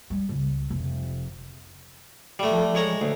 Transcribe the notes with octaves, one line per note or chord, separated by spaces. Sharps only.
G3
C#2
F1
G3 A3
F3 A4
G#3 C#5 A#5
D2